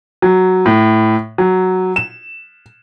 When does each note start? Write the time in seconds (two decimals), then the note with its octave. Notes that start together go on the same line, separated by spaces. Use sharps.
0.22 F#3
0.66 A2
1.38 F#3
1.96 E7